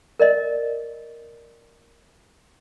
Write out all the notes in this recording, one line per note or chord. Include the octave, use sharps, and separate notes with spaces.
A#4 D5 D#5